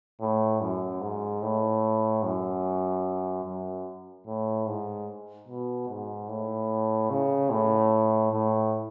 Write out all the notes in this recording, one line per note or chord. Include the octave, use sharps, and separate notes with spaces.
A2
F#2
G#2
A2
F#2
F#2
A2
G#2
B2
G#2
A2
C#3
A2
A2